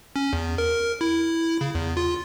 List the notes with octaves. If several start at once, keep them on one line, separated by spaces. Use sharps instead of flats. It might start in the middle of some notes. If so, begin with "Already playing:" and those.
C#4
E2
A#4
E4
C#3
E2
F4